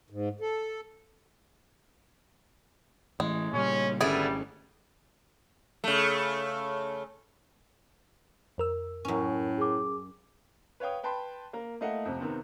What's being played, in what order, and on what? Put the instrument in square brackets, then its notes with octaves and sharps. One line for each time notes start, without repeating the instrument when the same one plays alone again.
[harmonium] G#2
A4
[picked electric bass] A2 E3 [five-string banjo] G#3
[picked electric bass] A#2 C#3 G3 [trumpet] C#4
[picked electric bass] G#1 C#4 [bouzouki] D3 B3 E4 [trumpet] G3 [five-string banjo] G#4
[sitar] C#3 A3
[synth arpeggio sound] F2 A#4 E6
[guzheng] F#2 C#4 [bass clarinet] A2
[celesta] G#4 D6
[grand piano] B4 C#5 F5 G5 D#6
B4 G5 A5 B5 C6
A#3 A#4
A3 A#3 E4 D#5 F5 F#5
F2 C3
C3 D#3 B3 C4